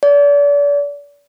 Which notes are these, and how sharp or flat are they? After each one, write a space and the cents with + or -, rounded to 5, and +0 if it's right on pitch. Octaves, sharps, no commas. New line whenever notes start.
D5 -35